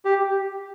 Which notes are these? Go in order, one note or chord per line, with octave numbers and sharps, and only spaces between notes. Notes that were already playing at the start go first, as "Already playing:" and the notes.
G4